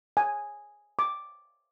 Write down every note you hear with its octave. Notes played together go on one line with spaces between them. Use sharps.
G#5
D6